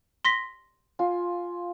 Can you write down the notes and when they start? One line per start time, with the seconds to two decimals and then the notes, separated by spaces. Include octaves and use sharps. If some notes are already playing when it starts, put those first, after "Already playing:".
0.25 C6 A#6 B6
0.99 F4 G#5